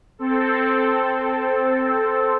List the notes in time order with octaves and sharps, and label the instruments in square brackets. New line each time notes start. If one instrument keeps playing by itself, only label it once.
[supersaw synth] C4 A4